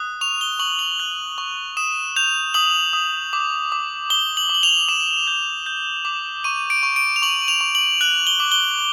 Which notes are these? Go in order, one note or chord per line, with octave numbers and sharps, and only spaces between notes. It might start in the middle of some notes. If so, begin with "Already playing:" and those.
Already playing: D#6 F#6
C#6 F7
G7
C#6 F#7
F#7
F#6
C#6
D#6 E7
G6 F7
D#6 F#7
D#6
D6
D6
D6 G7
F#7
D6
F#7
F7
D6 E7
G6
G6
D6
C#6 D#7
D7
C#6
D7
F7
C#6 F#7
F7
C#6
F#7
F#6 F#7
G7
D6
G7